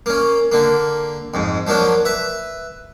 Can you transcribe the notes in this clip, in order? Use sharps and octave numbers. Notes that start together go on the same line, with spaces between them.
A#3 C#4
D3 A#3
F2 G#2
F3 F#3 A#3 D4
B4 E5